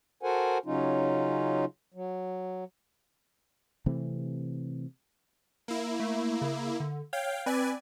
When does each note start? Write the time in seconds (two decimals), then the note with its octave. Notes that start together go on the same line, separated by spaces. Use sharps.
0.23 F#4 A4 A#4 C5 F#5 G#5
0.65 C#3 F#3 C#4 D#4 F4
1.94 F#3
3.86 C3 E3 A3 C4
5.68 A#3 E4
6.00 A3
6.41 C#3
6.80 D3
7.13 C#5 F5 G5
7.46 C4 B4 D5 G#5